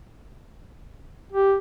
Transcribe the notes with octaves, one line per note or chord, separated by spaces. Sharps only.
G4